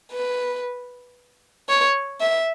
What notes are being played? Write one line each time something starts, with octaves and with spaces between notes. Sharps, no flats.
B4
C#5
E5